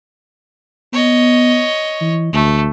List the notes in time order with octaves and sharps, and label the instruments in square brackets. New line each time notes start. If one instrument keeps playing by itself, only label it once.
[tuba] B3 [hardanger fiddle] C#5 D#5
[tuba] E3
[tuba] D2 [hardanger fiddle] A3